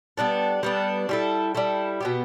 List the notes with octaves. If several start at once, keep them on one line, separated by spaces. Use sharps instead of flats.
G3 B3 D4 A4
G3 B3 D4 A4
G3 E4 A4
G3 E4 A4
B2 B3 G4